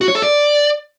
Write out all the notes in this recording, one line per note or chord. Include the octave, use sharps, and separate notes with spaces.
F#4
C#5
A4
D5